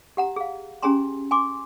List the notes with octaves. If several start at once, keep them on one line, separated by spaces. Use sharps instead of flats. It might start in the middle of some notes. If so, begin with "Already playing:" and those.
G4 F#5 A#5
G#4 F5
C#4 G4 G#4 G#5 A#5 C6
G#5 C6 D6